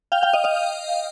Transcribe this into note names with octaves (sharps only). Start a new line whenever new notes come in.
F5 G5
F5 G5
D#5 F5
D#5 F5